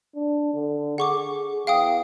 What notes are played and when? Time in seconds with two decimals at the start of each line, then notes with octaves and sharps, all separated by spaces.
0.16 D4
0.53 D3
0.98 G#4 F#5 C#6 D6
1.67 E2 F5 G5 D#6